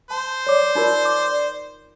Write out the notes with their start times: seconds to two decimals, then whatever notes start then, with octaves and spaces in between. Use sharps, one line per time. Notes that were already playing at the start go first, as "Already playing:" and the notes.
0.10 C5 A5
0.47 C#5 D5 D6
0.75 D#4 F4 A#4 D5
1.05 D6